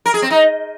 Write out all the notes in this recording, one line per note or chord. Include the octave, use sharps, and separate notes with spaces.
A#4
G#4
C4
D#4